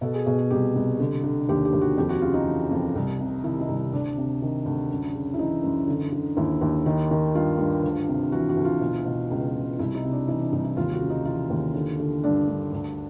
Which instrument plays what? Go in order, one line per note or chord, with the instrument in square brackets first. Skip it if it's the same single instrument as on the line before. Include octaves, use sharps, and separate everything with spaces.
[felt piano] B2 A4
G#4
B2 G#4
G#4
C2 G4
C2
D3
D3
D#2 G4
G4
D#2
F#4
F2 G4
F#4
C#3 F4
D#4
E3
F2
C2
C3
D#3 E4
D#4
C2
D#4
D2 D4
C3
D#3
D2
F#2
C#3
E4
E3 D#4
F#2
D3
D3
D#2 E4
D#2
D#3
D#3
G2 F4
G2
D2
C3
E3 F#4
F#4
D2
F4
B2
B2
C#2
C#2
C2 E4
D#4
C3
D4
E3 D#4
D4
C2 D#4
E4
D#2 F4
F#4
C#3
D#4
E3 F4
D#2
D3
D3
G2 D4
G2
D2